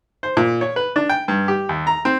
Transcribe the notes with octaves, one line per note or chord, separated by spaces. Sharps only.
C5
A#2
C#5
B4
D4
G5
G2
G4
D#2
A#5
C4